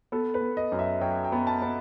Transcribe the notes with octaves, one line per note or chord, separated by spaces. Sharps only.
B3 A4
B4
B3
D#5
F#2
E5
F#3 G5
G5
B3
A5
B3